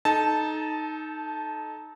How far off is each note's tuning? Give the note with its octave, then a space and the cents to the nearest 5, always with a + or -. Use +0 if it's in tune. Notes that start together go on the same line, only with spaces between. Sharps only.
D#4 +0 A4 -30 A5 -10